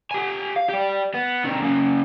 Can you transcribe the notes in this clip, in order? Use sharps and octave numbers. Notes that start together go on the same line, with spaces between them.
G4 G#5
F5
G4 D5
B3
C3 D#3
F#2 C#3